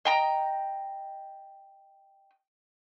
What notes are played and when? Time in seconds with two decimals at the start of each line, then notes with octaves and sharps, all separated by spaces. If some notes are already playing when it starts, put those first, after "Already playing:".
0.05 D#5 G5 A#5